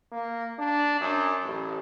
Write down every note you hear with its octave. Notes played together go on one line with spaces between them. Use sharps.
A#3
D4
F#2
A1